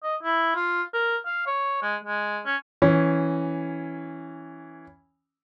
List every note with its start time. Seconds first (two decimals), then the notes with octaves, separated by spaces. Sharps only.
0.03 D#5
0.23 E4
0.56 F4
0.94 A#4
1.26 F5
1.47 C#5
1.82 G#3
2.05 G#3
2.46 C#4
2.82 E3 C#4